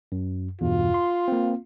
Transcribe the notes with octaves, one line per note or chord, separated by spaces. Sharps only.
F#2
E2 G2 B2 F4
C6
A#3 C4